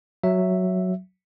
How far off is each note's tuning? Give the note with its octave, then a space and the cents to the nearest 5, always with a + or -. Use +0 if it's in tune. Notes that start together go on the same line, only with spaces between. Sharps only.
F#3 +0 E5 +0